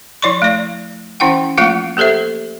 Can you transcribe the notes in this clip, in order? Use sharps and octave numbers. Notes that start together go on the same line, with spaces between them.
F3 E4 C#5 D5 C6 C#6
A3 D5
E3 C#4 E4 F#5 G5
F3 A3 A#3 F4 F#5
A#3 G4 A4 C5 E5